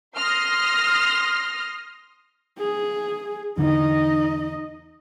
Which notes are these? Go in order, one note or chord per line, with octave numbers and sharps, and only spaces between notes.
C6 D#6 F6 A#6
G#4
E2 D3 E3 D#4 D#5